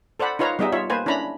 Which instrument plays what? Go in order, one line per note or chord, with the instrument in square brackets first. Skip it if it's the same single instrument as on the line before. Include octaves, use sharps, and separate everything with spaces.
[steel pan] A4 C5 D5 F#5 B5
D#4 F4 B4 C#5 F5 A#5
G3 B3 D#4 G#4 D#5 E5
F4 C#5 E5
A#3 B4 C5 G#5
C#4 D4 E4 A#5 B5